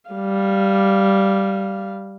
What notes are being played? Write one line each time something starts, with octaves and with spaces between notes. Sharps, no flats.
G3 F5